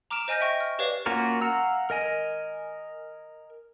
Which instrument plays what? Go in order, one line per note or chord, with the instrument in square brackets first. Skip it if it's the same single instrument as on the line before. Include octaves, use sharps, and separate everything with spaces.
[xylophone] A#5 D6 F6 D7 E7
C5 D#5 G#5 F6 G6 A#6
E5 G5 C#6 A#6
F6
G4 B4 C#5 D5 F5
[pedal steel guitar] A#3 C#4 F4 F#4 A#4
F5 F#5 A#5 E6
A#4 D#5 G#5